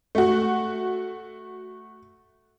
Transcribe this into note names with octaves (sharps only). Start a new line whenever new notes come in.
A3 F#4